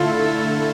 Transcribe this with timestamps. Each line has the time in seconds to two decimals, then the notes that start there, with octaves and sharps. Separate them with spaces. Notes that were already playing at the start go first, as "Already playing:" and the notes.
Already playing: D3 A3 E4 F4 A4